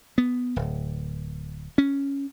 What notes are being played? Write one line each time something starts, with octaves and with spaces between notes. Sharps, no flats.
B3
D1
C#4